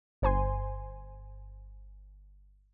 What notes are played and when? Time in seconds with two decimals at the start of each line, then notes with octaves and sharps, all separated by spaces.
0.22 G1 C5 G#5 C6